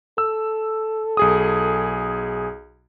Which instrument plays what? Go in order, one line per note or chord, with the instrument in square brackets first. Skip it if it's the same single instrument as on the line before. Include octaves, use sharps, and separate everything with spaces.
[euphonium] A4 [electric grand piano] E6
[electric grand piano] B1 G#4 D#6